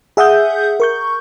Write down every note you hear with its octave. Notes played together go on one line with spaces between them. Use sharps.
G#4 E5 F#5 D#6 G6
A#4 C#6 G6